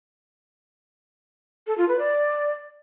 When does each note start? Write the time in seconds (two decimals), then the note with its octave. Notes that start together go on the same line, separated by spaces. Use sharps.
1.67 A4
1.78 F4
1.88 B4
1.99 D5